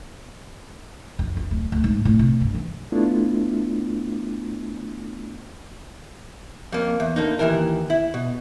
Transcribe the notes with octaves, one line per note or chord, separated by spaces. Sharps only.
F2
F4
D1
D2
G#2
A2
C3
G2
E3
A3 B3 D4 E4 F4
F2 A#3
E2
D3 A#3 D#4
D#2 A#2 E3 E4 A#4
E4
B2